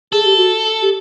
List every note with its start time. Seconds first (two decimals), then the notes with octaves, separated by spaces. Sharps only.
0.12 G#4 A4
0.25 G4
0.37 F#4
0.82 G4